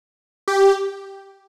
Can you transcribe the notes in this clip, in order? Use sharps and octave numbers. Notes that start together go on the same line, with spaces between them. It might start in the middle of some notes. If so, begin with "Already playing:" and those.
G4